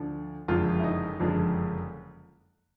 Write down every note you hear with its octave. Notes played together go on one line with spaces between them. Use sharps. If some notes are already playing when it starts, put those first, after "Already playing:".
Already playing: D2 D3 F3
F#1 F2 D3 F3 G#3 F4
E4
D#4
F#1 F2 D3 F3 G#3